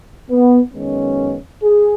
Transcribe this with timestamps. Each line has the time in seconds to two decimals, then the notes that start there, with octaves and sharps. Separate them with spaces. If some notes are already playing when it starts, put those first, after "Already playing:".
0.29 B3
0.73 F#2 D#3 G#3 B3 C#4
1.64 G#4